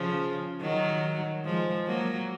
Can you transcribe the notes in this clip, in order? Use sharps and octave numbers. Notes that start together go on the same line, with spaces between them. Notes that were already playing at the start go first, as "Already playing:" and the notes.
Already playing: C#3 F3
D#3 F#3
F3 G#3
F#3 A#3